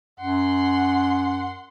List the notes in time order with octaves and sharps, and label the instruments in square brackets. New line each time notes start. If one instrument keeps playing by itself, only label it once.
[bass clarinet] F#2 [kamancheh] F#5 C6